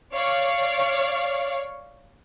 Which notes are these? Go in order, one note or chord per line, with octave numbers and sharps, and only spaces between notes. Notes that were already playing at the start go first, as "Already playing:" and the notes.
C#5 D5 F5